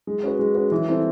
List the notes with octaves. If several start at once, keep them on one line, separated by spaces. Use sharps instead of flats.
G#3
C#4 F#4 B4
G#3
C#4 F#4 B4
E3
G3 C4 E4 A4